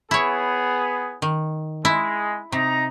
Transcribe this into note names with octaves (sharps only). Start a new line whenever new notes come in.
B3 E4 G#4 C#5
D#3
G#3 E4
C3 D#4 A#5